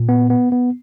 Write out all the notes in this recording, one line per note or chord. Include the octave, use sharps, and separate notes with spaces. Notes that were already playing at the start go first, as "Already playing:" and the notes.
Already playing: A#2
B3
B3
B3